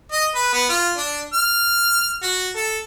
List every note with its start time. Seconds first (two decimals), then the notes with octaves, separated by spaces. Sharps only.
0.12 D#5
0.35 B4
0.53 B3
0.69 F4
0.97 D4
1.33 F6
2.22 F#4
2.56 A4